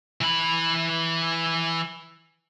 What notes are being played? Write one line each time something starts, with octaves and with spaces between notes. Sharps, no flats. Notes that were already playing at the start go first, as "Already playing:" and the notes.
E3 B5